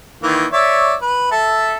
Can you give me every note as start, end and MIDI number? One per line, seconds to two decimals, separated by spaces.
0.23 0.46 51
0.23 0.46 52
0.23 0.46 58
0.52 0.95 73
0.52 0.95 74
0.52 0.95 76
1.02 1.28 71
1.31 1.78 69
1.31 1.78 76